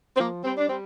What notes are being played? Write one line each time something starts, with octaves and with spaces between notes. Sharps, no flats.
C4
F3 A#3
G3 C4
D4
G3 C4